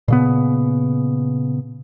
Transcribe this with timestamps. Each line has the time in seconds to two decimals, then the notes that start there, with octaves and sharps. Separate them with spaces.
0.08 A#2 C#3 B3